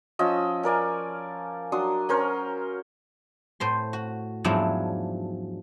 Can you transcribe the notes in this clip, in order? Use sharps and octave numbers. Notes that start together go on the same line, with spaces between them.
F3 C#4 D#5 E6
C#4 A#4 D5 G#5
F#3 D4 C6 D#6
C#4 A#4 C5 C#5
A2 C5 C6
F#4
E2 G#2 F3 F#3 D4 E4